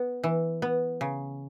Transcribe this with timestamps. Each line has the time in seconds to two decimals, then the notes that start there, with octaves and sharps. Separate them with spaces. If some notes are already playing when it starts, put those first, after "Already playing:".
Already playing: B3
0.24 E3
0.62 B3
1.01 C#3